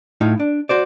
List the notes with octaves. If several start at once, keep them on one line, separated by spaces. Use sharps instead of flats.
A2 D#4 F4
D4
F#4 C5 D5